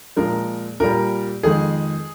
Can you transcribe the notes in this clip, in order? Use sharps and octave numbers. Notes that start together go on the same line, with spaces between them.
A#2 F3 G#3 A#4
A#2 G3 A#4
F2 D#3 G#3 G#4